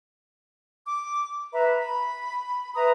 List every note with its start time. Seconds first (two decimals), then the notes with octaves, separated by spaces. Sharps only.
0.86 D6
1.53 B4 E5 A#5 B5
1.77 B5
2.76 B4 E5 A#5 D#6